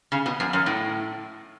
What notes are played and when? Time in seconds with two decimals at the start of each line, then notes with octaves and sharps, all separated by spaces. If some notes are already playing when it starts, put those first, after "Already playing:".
0.12 C#3
0.26 B2
0.40 F#2
0.53 F#2
0.66 A2